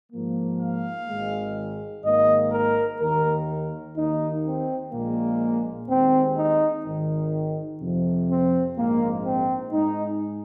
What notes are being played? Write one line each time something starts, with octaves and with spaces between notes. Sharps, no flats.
G#2 F3 A#3
F5
G#1 G#2 D#3 G#3
G#1 G#2 D#3 A#3 D#5
A#4
D#2 D#3 A#3 A#4
D#2 D#3 A#3 D#4
C4
A#1 A#2 G#3 A#3
D#2 D#3 G#3 C4
D#4
G#1 G#2 D#3
F2 C3 F3
C4
A#1 G#2 G#3 A#3
C4
G#2 G#3 D#4